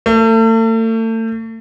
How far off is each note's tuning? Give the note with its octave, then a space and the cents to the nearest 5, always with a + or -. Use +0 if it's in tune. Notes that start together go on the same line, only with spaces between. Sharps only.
A3 +40